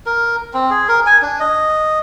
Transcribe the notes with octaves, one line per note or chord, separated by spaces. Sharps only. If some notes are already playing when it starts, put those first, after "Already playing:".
A#4
C4
G#4
A#4
G#5
D4
D#5